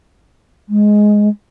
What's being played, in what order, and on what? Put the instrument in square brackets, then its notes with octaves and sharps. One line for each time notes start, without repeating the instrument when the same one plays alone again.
[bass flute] G#3